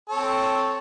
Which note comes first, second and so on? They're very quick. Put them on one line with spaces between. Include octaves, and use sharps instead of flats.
A4 C#5 C4